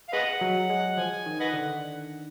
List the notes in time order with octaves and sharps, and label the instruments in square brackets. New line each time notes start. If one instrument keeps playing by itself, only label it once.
[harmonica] F5
[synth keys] G#3 [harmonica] B4 D#5 F#5
[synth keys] F#3
G#3
[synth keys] F3 [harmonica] G#5
[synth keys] D#3
[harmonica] B4 D#5 F#5
[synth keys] D3